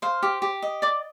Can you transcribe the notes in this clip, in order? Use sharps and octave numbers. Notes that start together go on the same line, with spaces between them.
C5 F5
G4
G4
D#5
D5 D6